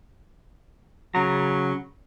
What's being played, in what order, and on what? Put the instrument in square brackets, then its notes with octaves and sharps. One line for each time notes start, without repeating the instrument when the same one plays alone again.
[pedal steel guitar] C#3 A#5 [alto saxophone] F#3